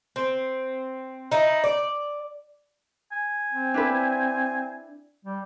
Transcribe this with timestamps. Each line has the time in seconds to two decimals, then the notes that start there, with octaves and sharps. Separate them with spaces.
0.16 C4
1.31 D#4 E4
1.64 D5
3.12 G#5
3.51 C4
3.74 D4 E4 B4
5.25 G3